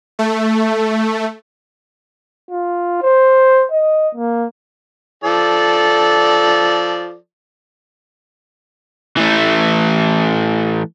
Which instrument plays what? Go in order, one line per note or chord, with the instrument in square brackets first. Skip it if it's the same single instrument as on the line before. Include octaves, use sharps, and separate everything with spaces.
[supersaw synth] A3
[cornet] F4
C5
D#5
A#3
[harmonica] F3 A4 D5
[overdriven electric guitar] E3 A3